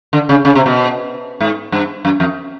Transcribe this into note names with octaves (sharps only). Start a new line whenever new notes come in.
D3
C#3
C#3
C3
B2
G#2
G2
F#2
F2